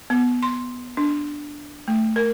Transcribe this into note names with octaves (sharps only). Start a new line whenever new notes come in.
B3
C6
D4
A3
A#4